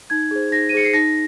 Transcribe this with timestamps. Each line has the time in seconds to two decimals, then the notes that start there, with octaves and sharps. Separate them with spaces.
0.10 D#4 G#6
0.31 G#4 C5
0.51 D#4 A#6
0.69 D#7
0.72 G#4 C5 C#7
0.85 C7
0.93 D#4 A#6